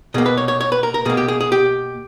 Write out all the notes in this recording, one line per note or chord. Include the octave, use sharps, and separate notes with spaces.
B2 A#3 G#4
B4
C#5
C#5
C#5
B4
A#4
A#4
B2 A#3 G#4
G4
G#4
G#4
G4